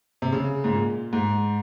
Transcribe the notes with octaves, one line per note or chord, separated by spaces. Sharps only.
C3
C#3
G#2
A#2
G#2